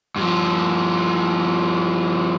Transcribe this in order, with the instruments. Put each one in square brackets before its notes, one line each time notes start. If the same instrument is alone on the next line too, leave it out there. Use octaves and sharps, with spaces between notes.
[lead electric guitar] G2 F3